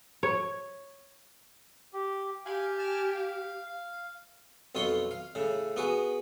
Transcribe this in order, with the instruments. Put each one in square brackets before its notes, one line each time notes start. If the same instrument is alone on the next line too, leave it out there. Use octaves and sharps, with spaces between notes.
[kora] C#5
[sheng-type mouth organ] G4
[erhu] G4 [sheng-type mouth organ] F5 G#5
[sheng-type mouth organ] G#5 A5 F6
F5
F5
[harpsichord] B1 F2 F4 C#5 C6
F5
A2 C#3
B3 F#4 G#4